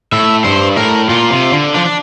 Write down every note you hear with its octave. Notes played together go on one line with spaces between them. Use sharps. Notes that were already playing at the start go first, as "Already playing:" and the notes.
A2 E5
G2 C5
A2 A#4
A#2 F4
C3
D3
F3 D4
D4